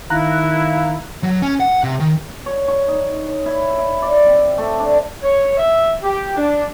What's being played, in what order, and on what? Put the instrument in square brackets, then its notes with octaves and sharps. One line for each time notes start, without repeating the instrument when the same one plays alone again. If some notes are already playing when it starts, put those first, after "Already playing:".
[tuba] D#3 [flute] E4 [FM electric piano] F5 A#5 F#6
[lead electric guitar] F#3
C#4
F#5
C3
D#3
[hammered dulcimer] C#5
C#6
D#4
C#5
E4
E4
D5
C4
A3
D4
[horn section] C#5
E5
G4
D4